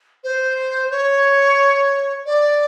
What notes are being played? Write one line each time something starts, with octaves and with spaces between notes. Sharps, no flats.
C5
C#5
D5